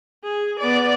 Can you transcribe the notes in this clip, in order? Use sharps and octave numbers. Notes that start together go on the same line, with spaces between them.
G#4
B3 D5